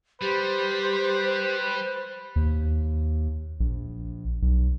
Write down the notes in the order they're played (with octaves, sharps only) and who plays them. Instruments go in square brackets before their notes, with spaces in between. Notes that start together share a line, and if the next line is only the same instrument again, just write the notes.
[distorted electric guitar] G3 [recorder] G4 [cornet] B4 [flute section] C5
[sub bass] D#2
A#1
B1